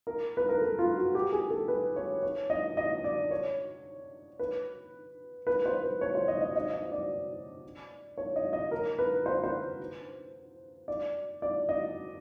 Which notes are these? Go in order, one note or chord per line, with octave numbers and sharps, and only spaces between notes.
A#4
B4
A#4
A4
F4
F#4
G4
G#4
A4
B4
C#5
C#5
D#5
D#5
D5
C#5
B4
B4
C5
B4
C#5
C5
D#5
D#5
D#5
D#5
D5
C#5
D#5
D#5
A#4
B4
C5
C5
D5
D5
D#5